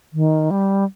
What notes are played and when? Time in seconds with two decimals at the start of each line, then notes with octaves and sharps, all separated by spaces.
0.13 D#3
0.51 G3